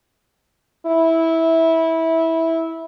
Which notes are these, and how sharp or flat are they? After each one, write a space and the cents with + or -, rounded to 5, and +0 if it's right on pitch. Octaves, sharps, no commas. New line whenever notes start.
E4 -15